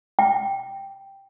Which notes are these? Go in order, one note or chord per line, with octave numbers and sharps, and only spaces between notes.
G5